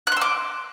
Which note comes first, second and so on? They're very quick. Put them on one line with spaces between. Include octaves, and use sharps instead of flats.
F#6 C6 E6 D6